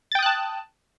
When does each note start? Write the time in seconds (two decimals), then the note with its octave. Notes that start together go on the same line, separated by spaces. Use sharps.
0.12 A6
0.15 G5
0.19 D#6
0.22 F#6
0.26 A5